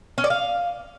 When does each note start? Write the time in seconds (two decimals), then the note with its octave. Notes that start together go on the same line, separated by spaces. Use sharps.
0.18 C#4
0.24 D5
0.30 F5